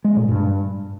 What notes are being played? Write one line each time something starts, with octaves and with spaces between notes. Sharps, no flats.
G#3
A#2
G2